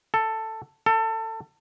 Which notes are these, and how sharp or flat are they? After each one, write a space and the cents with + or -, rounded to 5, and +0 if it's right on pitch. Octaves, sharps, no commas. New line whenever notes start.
A4 +10
A4 +25